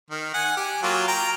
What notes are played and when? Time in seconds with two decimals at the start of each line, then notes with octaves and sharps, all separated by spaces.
0.11 D#3
0.34 F#5 G#5
0.56 G4 G#5
0.83 F#3 A#3 F4
1.08 G5 A#5